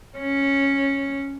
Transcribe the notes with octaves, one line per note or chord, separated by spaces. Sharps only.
C#4